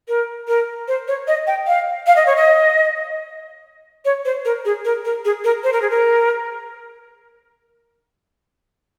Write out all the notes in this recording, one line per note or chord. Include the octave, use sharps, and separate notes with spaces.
A#4
A#4
C5
C#5
D#5
G5
F5
F5
D#5
C#5
D#5
C#5
C5
A#4
G#4
A#4
A#4
G#4
A#4
C5
A#4
G#4
A#4